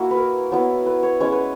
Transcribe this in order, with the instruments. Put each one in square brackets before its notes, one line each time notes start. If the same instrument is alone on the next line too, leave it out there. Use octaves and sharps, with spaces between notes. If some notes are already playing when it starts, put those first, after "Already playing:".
Already playing: [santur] A#3 E4 F#4
B4
A#4
F#3 B3 E4
B4
C#5
G#3 C#4 E4 C#5
B4